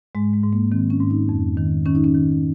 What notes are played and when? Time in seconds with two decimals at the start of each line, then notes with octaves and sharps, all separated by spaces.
0.15 G#2 G#3
0.34 G#3
0.43 G#2
0.53 A#3
0.72 D#3 C4
0.90 C#4
1.00 G#2
1.10 D#4
1.29 F2
1.57 D#3
1.86 D#3 C#4
1.95 D#4
2.04 C#4
2.15 D#3